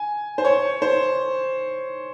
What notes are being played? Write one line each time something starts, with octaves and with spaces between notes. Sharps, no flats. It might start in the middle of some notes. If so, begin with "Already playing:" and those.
Already playing: G#5
C5
C#5
C5